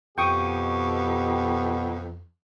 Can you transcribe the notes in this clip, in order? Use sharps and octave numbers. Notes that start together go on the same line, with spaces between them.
F2 B2 G4 G5 C#6 D#6